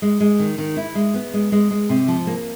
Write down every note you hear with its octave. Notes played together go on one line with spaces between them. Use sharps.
G#3
G#3
D#3
D#3
E4
G#3
B3
G#3
G#3
G#3
C3
F3
A#3